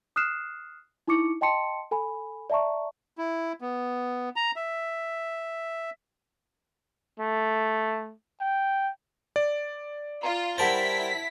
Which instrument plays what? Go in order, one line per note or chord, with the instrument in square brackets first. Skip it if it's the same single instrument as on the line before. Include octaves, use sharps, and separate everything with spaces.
[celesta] D#6 F6 F#6 C7 E7
D#4 E4 C#6 D6 C#7
D#5 G5 A5 C6 C#7
A4 G#5 B5
D5 E5 A5 A#5 C#6
[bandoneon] E4
B3
A#5
E5
[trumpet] A3
G5
[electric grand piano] D5
[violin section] F4 [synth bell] A#5
[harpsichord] G3 A#4 C5 [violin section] E4 B6 [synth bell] F#5 A5 A6